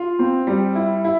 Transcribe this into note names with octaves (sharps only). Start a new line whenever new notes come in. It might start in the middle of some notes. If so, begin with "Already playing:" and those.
Already playing: F4
C4
G3
E4
E4